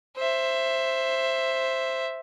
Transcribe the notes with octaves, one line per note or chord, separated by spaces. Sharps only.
C5 E5